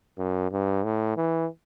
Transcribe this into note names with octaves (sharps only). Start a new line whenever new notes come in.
F#2
G2
A2
E3